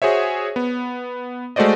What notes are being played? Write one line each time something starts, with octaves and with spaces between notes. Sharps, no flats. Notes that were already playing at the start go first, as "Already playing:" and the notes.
F#4 G#4 C5 C#5 E5
B3
G#3 A3 F#4 C5 D5 D#5